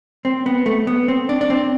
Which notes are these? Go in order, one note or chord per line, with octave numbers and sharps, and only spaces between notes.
C4
B3
A3
B3
C4
D4
D4
C4